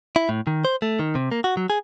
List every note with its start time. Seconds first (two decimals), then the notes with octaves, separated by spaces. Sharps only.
0.16 E4
0.29 A2
0.47 D#3
0.65 C5
0.82 A3
0.99 D#3
1.15 C3
1.32 A#3
1.44 F#4
1.57 F#3
1.70 G#4